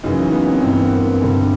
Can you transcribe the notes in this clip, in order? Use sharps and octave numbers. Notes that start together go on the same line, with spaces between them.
F#2 C#3 E3 D#4
C#4
B3
C4
G2 E3 C4
B3
A#3
C4
G2 D3